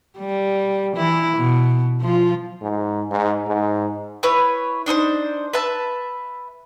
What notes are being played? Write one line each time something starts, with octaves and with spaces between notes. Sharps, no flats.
G3
E3 E4
B2
F3 F4
G#2
G#2
G#2
E4 B4 C#5
D4 D#4 A4 C5
B4 E5 A5